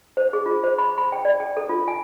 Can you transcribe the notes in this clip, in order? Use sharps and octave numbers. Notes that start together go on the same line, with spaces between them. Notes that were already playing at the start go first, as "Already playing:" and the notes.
C5
G#4
F4
C5
B5
B5
G5
D5
G5
A4
F4
G#5